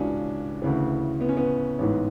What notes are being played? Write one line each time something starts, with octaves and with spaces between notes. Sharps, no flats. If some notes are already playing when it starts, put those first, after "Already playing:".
Already playing: C#2 C#3 E3 C#4 D4 F#4
D2 C#3 E3
B3
C#4
B3
A1 G#2 E3